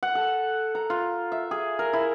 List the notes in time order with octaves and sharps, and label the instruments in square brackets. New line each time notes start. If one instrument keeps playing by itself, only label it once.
[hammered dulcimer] F#5
A4
A#5
F4
E5
G#4
A#4
E4